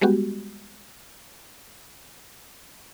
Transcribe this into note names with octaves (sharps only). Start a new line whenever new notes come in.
G3 G#3 B3 F#4 G4